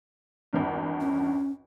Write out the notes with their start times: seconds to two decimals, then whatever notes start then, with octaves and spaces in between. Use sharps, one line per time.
0.53 G#1 E2 G2
1.01 C#4